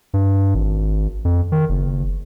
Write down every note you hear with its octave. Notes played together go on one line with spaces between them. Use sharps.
G2
G#1
F2
D#3
F#1